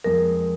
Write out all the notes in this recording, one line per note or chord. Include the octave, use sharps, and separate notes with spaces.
F2 F3 G#3 A#4